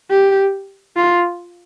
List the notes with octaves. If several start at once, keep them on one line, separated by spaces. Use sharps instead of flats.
G4
F4